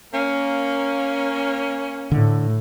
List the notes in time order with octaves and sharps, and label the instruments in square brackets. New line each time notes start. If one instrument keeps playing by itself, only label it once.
[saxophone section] A#3 C#4
[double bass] A2 [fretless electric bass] D3 A3